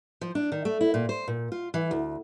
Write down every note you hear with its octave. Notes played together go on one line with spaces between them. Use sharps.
F3
D4
D#3
A3
E4
A#2
C5
A#2
F4
E3
D2